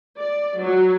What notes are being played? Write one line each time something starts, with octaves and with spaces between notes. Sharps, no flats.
D5
F#3